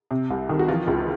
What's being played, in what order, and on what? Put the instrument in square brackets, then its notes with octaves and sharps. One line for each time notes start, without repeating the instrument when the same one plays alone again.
[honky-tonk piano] C3
C2
D#3
F#4
E3 F3 F4
C#2